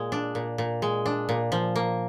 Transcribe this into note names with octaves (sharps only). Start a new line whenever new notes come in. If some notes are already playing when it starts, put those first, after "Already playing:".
Already playing: A#2 G#3
D4
A#2
A#2
G#3
D4
A#2
F3
A#3